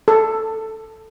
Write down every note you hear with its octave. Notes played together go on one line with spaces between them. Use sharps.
A4